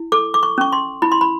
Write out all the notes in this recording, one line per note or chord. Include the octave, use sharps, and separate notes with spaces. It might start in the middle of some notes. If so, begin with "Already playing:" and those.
Already playing: E4
A4 D6
D6
C#6
C#4 C#6
C6
E4 B5
C6
B5